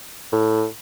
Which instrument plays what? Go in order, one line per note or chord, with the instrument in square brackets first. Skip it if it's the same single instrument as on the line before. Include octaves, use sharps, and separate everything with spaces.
[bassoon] A2